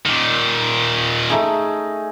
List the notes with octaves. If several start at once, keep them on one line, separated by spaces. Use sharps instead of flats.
A#2 D#3
A3 D#4 G#4